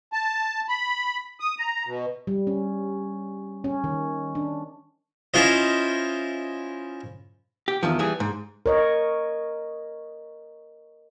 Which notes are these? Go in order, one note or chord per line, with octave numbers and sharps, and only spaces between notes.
A5
B5
D#6
A#5
B2
G3
C#4
C#4
D#3
D4
C#4 E4 F4 C5 D#5
G4
E2 D#3 F3
E3 G3 G#4
G#2
A#4 C#5 D#5